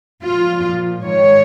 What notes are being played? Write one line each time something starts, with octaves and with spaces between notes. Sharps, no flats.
A#2 F3 F4
G#2 D#3 C#5